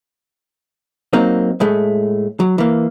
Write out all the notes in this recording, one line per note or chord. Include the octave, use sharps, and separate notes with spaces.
F#3 A#3 C4 D#4
A2 G#3 A3
F#3
E3 A#3